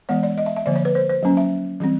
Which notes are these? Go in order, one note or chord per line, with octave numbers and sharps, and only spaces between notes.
E3 G#3 B3 C#5
D5
D#5
E5
E5
D3 F3 A#3 D5
C#5
B4
C5
C5
F#3 A#3 C#4
E5
E3 G3 C4